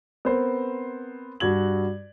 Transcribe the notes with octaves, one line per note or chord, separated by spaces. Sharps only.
B3 C4 A#4 C5
G2 F#4 G#6 F#7